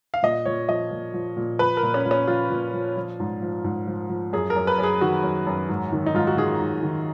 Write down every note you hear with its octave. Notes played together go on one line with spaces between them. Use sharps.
F5
A#2 D#5
A#2 C#5
F3 D#5
A#2
F3
A#2
F3 B4
A#4
A#2
C#4
A#2
C#4
F3 F4
A#2
F3
F3
G#2
F3
G#2
F3
F3
F#2 G#4
A#4
F#2
B4
F#2
G#4
D#3 F#4
F#2
F#2
G#2
D#3
D#4
G#2 F4
F#4
D#3 G#4
G#2
D#3